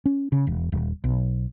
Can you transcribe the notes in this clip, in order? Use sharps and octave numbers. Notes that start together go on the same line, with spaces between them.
C#4
C#3
E1
D#1
B1